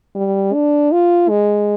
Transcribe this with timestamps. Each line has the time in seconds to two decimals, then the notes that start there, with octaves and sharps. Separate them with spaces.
0.15 G3
0.53 D4
0.92 F4
1.29 G#3